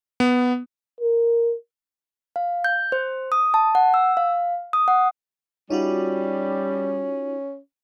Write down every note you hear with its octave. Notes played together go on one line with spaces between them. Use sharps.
B3
A#4
F5
G6
C5
D#6
A5
F#5
E6
F5
D#6
F#5
G3 C#4 D#4 F4 F#4